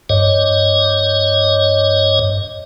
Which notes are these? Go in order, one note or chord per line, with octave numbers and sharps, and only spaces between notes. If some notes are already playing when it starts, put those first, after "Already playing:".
G2 C#5 D#5